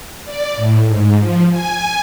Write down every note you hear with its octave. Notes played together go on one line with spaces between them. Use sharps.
D5
A2
G#2
F3
G#5